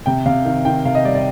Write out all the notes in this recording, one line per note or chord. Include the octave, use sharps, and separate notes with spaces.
C3 G5
C3 F5
D#3 F5
D#3 G5
C3 F5
D#5
G3 D5
D5